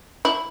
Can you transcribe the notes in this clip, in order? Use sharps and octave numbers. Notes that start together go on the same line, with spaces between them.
E4